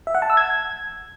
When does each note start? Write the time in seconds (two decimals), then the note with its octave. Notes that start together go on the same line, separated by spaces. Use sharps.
0.07 E5
0.15 F#5
0.22 A5
0.30 E6
0.37 G#6